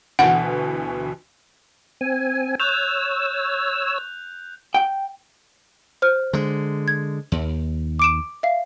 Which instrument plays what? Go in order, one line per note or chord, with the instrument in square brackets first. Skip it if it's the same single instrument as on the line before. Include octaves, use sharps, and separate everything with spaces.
[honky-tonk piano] D2 B2 E3 [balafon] F#5
[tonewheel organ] C4 G#5
[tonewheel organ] C#5 E6 [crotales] F#6 G6 F7
[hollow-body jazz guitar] G5
[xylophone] C5 F6
[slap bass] D3 G#3
[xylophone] G#6
[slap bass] D#2
[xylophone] D6 D7 E7
E5 F5